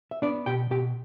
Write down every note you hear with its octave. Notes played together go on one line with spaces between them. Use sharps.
E5
B3 D4 D5
B2 G4 G5
B2 G4 G5